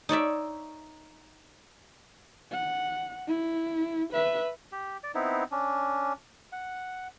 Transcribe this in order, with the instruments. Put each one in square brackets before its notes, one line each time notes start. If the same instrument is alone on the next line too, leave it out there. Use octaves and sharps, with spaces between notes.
[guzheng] D#4 C#5 D5 E5
[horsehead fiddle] F#5
E4
B4 E5
[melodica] G4
D5
B3 C4 D#4 E4
C#4 D4
F#5